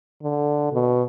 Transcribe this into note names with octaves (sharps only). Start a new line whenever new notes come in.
D3
B2